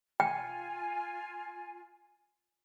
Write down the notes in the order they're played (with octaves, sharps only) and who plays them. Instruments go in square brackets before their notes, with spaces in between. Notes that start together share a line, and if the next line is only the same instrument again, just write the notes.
[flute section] F4 G#5 [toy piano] G5